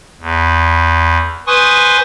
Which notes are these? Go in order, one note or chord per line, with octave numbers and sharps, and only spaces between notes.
E2
B4 C5 G#5 C6 C#6 D#6